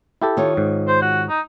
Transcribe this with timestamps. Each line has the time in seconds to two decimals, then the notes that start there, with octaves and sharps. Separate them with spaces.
0.22 E4 G4 A4
0.37 D#3 F4 C#5
0.57 G#2
0.88 C5
1.02 F#4
1.29 D#4